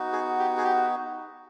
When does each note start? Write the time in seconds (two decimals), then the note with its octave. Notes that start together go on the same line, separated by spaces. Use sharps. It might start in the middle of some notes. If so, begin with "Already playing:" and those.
Already playing: B3 D#4 F#4
0.12 G#4
0.39 G4
0.58 G#4
0.64 G4